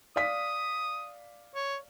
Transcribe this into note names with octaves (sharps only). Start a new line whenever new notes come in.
D5 F5 D#6 B6
C#5